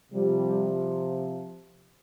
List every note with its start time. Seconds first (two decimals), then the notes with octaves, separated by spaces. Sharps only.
0.11 C3 F3 G3